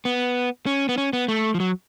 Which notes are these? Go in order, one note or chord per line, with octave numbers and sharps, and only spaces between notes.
B3
C#4
B3
C#4
B3
A3
F3
F#3